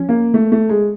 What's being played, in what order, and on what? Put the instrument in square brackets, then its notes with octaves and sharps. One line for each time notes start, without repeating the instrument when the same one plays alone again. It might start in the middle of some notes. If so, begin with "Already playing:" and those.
Already playing: [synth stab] F3 C#4
[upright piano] A#3
A3
A3
G#3